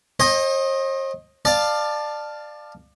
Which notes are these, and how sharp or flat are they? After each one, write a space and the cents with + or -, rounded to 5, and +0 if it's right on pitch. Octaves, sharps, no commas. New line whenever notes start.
C5 +45 D#5 +0 G5 +35
D5 +25 F5 +0 A5 +0